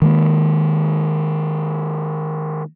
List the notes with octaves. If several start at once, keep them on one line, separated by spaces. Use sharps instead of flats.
D#3 G#3 A#3